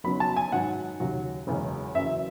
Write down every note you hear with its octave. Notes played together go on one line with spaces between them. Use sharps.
F#1 F#2 D#3 F#3 B3 B5
A5
G#5
G#2 D#3 F#3 F#5
D#2 C#3 F#3
F#1 E2 C#3 G#3 C#4
F#1 F#2 E3 E5